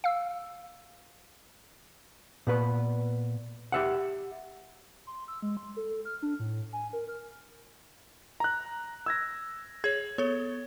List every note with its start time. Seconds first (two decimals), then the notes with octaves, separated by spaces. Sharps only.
0.04 F5 E6
2.47 A#2 B3 B4
3.72 G4 E5 F#5
5.07 C6
5.28 E6
5.42 G#3
5.57 C6
5.77 A4
6.05 F6
6.22 D4
6.40 A2
6.73 G#5
6.93 A#4
7.08 F6
8.40 A#5 F#6
9.06 E6 G#6 A#6
9.84 G#4 C#5 G#6
10.18 B3 A4 C#5